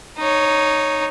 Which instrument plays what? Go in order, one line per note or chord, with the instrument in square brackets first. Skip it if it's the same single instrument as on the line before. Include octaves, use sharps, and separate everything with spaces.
[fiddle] D#4 C#5